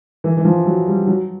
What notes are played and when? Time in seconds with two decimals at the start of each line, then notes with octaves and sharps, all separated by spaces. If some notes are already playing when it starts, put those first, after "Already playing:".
0.24 E3
0.37 E3
0.45 F3
0.66 F#3
0.87 G3
1.07 F#3